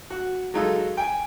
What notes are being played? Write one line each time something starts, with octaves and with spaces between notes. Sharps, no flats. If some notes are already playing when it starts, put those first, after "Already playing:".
F#4
F#3 G#3 D#4 F4 A4
G5 G#5